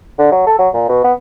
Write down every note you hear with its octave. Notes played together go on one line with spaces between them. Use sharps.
D3
F#3
A4
F#3
A#2
B2
B3